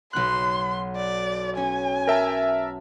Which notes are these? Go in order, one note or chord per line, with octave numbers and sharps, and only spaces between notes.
B1 B3 C6 F#6
D5
C#4 G#5
A#4 E5 A5